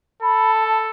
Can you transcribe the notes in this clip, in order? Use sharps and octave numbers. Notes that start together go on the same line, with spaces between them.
A4 B5
A5